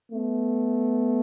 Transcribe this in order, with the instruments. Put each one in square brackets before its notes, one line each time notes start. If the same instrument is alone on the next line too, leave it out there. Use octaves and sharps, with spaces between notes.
[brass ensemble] A3 B3